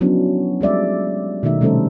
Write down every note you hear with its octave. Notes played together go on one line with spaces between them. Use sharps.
F3 F#3 B3 C#4 D4 E4
G3 G#3 D5 E5
B2 D#3 A3 D#4 E5
C3 G3 A3 C#4 A4 C5